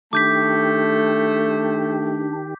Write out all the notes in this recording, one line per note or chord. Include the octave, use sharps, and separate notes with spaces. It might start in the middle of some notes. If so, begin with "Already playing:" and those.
D#3 A3 D4 G4 D6 G6 B6